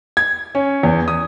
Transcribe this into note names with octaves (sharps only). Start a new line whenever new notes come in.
G#6
C#4
E2
D#6